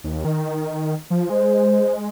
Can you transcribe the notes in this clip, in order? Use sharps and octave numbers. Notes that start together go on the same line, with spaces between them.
D#2
D#3
F3
G#3 C5